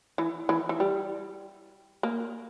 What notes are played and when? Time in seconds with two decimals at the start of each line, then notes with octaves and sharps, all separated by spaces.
0.18 E3
0.49 E3
0.69 E3
0.80 G3
2.03 A#3